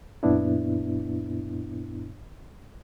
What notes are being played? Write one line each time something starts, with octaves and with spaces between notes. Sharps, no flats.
F#2 A#2 B3 D4 E4